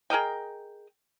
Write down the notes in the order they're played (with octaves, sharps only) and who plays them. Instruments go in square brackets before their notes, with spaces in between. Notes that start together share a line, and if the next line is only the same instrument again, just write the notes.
[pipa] G#4 A#4 D#5 G5